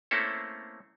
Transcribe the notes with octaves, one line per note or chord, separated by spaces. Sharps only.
A3 A#3 C4 C#4 E4 A4